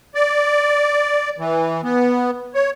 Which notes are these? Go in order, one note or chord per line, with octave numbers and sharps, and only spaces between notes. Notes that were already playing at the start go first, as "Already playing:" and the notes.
D5
E3
B3
C#5